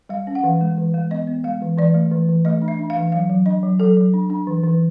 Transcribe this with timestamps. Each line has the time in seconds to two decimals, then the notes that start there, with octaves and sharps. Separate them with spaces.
0.09 G3 F5
0.27 C#4
0.35 F#5
0.44 E3 F5
0.61 G#3
0.78 E3
0.94 G#3
1.11 B3 D#5
1.27 B3
1.44 G#3 F5
1.62 E3
1.78 E3 D5
1.94 A3
2.11 E3
2.29 E3
2.45 A3 D#5
2.62 D4
2.68 E5
2.79 D4
2.90 F5
2.96 E3
3.12 F#3 F5
3.30 F#3
3.46 D4 D#5
3.63 F#3
3.80 F#3 A4
3.97 F#3
4.14 D4
4.30 D4
4.47 E3
4.63 E3